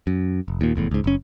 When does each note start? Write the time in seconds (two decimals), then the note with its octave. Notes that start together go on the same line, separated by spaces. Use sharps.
0.07 F#2
0.48 F1
0.61 D#2 A#2
0.76 F1 E2 A2
0.91 C#2 G#2
1.04 F#1 C#4